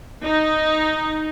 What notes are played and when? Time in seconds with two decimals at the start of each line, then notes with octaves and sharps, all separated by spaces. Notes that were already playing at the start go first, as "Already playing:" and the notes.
0.24 D#4